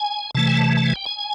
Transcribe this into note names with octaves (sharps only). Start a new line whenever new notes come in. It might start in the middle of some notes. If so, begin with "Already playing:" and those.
Already playing: G#5
C3 E3 A3 A5
G#5
A5
A5
G#5
G5
G#5